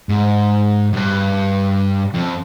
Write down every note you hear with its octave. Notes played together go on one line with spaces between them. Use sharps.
G#2
F#2
G2
F2